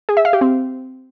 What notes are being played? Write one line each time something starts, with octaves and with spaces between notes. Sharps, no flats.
G#4
E5
F5
G4
C4